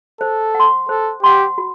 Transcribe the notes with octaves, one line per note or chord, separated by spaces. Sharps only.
A4 C5
F#5 C6
A4 C5
G4 F#5 C6
F#4